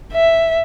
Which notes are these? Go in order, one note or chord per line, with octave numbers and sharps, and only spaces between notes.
E5